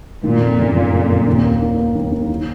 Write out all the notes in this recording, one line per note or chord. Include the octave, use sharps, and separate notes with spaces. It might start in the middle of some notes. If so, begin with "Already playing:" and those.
A#2 D#3
F2
F#1
F#1
F2
F#1
D#2
A#3
D#3
A#3
D#2
D#2
D#3